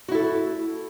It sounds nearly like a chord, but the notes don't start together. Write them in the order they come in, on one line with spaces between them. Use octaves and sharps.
F#4 E4 A4